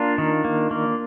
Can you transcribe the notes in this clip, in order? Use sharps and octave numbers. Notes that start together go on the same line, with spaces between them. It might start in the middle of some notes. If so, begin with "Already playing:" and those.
Already playing: A#3 D4 F4
D#3
A#3
A#3